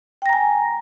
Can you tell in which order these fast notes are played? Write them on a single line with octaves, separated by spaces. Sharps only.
G5 A#6 A#5 G#5